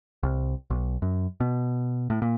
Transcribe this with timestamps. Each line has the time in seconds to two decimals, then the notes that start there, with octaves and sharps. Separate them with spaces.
0.23 C2
0.70 B1
1.02 F#2
1.40 B2
2.10 A2
2.22 A#2